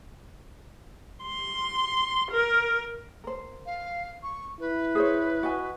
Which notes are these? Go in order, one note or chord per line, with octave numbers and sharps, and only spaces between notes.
C6
A#4
A#4 C5
F5
C#6
E4 B4
G#4 C5 C#5
F#4 D#5 G#5